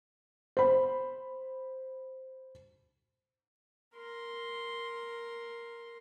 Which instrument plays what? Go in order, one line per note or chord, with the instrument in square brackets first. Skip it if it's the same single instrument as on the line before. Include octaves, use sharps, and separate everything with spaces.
[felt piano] C5 B5
[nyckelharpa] A#4 C6